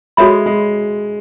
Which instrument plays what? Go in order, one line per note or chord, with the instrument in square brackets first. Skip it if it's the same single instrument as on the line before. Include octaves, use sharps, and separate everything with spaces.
[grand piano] G#3 [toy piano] F#4 A4 C#5 E5 B5
[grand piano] G#3